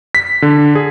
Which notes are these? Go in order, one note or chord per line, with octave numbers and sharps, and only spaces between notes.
B6
D3
G#4